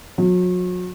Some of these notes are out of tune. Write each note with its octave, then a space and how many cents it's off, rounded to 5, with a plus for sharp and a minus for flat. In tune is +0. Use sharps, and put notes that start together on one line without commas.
F#3 -35